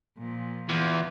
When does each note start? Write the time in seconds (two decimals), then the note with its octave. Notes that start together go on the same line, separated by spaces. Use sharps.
0.18 A#2 F3
0.70 E2 F4